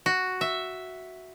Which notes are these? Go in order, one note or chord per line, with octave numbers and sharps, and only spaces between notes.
F#4
E5